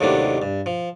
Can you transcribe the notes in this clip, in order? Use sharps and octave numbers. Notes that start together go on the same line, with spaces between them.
D#2 A2 C3 D#3 F#3 D4
G2
F3